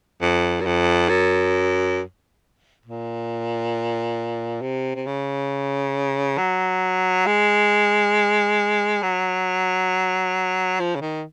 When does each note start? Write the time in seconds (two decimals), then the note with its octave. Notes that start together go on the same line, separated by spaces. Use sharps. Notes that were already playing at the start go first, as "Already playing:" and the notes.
0.21 F2
0.61 F#2
0.65 F2
1.09 F#2
2.86 A#2
4.62 C3
4.96 C3
5.06 C#3
6.38 F#3
7.26 G#3
9.03 F#3
10.80 F3
10.95 C#3
11.01 D#3